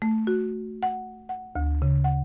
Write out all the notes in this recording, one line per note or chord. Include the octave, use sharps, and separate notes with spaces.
A3
F#4
F#5
F#5
D2
C#3
F#5